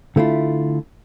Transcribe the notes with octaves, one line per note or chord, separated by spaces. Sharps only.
D3 A3 E4 F4